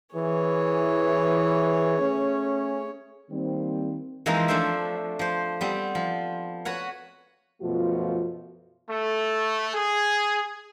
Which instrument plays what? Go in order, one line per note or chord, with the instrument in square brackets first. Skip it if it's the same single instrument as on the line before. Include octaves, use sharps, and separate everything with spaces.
[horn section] E3 [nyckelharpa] G#4 C#5
[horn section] A3 C#4
[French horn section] D#3 G3 A#3 C4
[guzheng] E3 F3 G#3 A#3 C4 D#4
F3 A3 D4 A4 C5 E5
F3 C5
G3 B3 C4
F3
F#4 B4 C#5 F#5
[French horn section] F#2 B2 F3 A3 F4 F#4
[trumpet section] A3
G#4